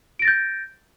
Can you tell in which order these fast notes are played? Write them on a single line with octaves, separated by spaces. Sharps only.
D7 A#6 A6 G6